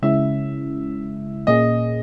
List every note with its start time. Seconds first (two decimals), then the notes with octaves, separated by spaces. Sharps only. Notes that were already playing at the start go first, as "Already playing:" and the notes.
0.03 C#3 G#3 C#4 E4 E5
1.47 A#2 A#3 C#4 G#4 D#5